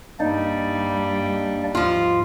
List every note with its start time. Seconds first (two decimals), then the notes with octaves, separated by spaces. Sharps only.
0.20 G2 G3 A#3 D4 D#4 D5
1.75 D#2 G#2 F3 F4